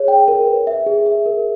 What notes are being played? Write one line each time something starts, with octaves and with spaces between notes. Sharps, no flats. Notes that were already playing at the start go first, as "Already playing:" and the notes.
Already playing: G#4 C#5
G5
A#4
B4
E5
G#4
E5
A#4